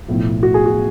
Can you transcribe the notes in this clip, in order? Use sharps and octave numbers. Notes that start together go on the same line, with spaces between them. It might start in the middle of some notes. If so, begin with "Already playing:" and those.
B1 A2 F3
F#4
G#4
F#4